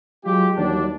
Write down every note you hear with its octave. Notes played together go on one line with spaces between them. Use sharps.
F#3 G#3 F4 G4
D#2 E3 F#3 G3 D4